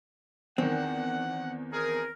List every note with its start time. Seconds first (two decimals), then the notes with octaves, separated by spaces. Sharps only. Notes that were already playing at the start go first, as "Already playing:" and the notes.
0.58 E2 D#3 C4 F#5
1.73 F3 D#4 G#4 A#4